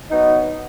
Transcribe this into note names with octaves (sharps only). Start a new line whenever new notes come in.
F#3 B3 D#4